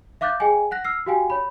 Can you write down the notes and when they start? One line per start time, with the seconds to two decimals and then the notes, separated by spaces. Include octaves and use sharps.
0.21 E5 F5 D6 F#6 G6 A6
0.40 G#4 D#5 G5 G#5
0.71 F#5 F#6 A#6
0.85 E6 F6 C7
1.06 F#4 G4 F5 G5 G#5
1.30 C#5 B5